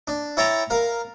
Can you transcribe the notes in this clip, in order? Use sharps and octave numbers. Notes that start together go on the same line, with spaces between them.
D4
E4 C#5 G5 A5 A#5
A#4 F5